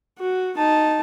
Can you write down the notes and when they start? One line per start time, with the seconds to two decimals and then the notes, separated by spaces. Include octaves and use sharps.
0.19 F#4
0.57 D#4 A5